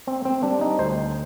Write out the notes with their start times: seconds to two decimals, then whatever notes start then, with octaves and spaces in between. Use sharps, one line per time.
0.07 C4
0.25 C4
0.43 G3 D4
0.61 D#4
0.79 D2 C5